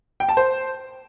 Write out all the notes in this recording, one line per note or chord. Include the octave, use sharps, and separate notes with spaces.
G5
A5
C5